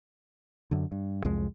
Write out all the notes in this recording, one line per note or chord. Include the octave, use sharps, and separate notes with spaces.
F#2 D3
G2
C2 F2 G#3